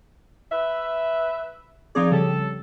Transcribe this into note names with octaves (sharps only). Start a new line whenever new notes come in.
B4 E5
F3 C4 D#4 G#4 D5
C#3 G3 A4